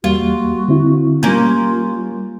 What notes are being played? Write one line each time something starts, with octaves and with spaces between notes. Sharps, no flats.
E2 G3 A#3 F4 F#4
D3 C4 E4
G3 A#3 C#4 F4 G6